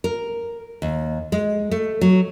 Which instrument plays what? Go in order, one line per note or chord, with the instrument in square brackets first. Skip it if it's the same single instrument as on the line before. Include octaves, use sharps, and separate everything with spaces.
[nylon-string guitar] A#4
D#2
G#3
A3
F#3